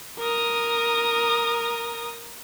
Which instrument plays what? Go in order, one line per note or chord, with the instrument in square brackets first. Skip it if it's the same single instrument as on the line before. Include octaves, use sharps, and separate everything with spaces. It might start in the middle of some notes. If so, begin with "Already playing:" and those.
[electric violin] A#4 D#6